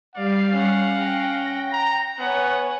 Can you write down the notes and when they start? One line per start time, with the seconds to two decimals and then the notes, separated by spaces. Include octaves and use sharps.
0.16 G3 D5 F5 C7
0.52 C#4 F#5
0.94 G5 A#6
1.73 A#5
2.19 B3 C#5 F#5 G#5